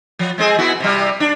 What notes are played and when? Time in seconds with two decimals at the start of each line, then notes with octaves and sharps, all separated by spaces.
0.19 F3
0.38 G#3 C4 G#4
0.58 B3 E4 F#4
0.80 C3 G3
1.20 D4